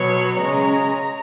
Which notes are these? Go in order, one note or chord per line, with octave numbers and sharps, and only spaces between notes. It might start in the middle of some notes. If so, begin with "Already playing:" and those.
Already playing: B2 F#3 B3 C#5
C#3 G#3 C#4 A#5